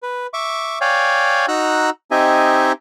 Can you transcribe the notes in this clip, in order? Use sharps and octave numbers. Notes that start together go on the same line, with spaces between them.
B4
E5 C#6 D6
C#5 D5 F5 G5 G#5
D#4 F#4 A#5 E6 F#6
C4 D#4 G4 D#5 E5 G#5